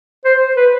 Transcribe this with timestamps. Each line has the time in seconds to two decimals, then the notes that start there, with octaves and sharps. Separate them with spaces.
0.25 C5
0.56 B4